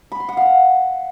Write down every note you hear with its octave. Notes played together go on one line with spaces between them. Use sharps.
B5
C6
F#5
F5
F#5